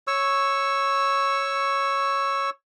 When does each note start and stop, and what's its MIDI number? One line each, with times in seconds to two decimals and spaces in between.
0.07 2.50 73
0.07 2.50 85
0.07 2.50 88